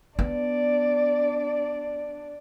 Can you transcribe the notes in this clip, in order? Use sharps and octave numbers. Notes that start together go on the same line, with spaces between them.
B3 D4 D5